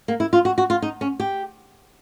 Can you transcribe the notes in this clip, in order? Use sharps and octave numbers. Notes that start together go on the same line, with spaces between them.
A#3
E4
F4
F#4
F#4
F4
D#4
C#4
G4